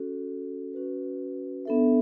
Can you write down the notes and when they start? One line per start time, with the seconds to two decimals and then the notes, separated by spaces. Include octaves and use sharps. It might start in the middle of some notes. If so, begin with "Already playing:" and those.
Already playing: C#4 F#4 A4
0.74 C#4 F#4 B4
1.65 B3 D4 A4 E5